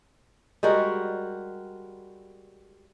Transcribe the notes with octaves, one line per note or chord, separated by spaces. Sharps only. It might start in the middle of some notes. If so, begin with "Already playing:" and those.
G3 G#3 F#4 A#4